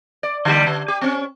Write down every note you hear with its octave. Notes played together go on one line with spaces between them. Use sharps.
D5
D3 G3 A#3
D3
G4
C4 C#4